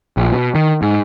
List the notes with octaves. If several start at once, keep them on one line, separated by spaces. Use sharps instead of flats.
A#1
B2
D#3
G#2